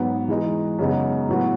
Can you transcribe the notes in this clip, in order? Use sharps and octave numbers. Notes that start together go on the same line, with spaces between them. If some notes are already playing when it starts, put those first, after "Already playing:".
Already playing: G#2 F#3 B3
E3 G#3 D#4
F#2 C#3 G#3 B3 D#4
A2 F#3 B3 F#4